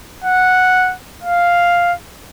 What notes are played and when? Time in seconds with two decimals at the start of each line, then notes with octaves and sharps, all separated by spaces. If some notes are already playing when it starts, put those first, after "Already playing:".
0.24 F#5
1.24 F5